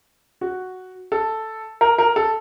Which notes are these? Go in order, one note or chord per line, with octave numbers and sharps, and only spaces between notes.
F#4
A4
A#4
A#4
A4